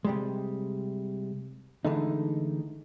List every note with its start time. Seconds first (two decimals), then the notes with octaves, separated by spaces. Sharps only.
0.05 C3 G3 G#3
1.85 D3 E3 G#3 A3 D#4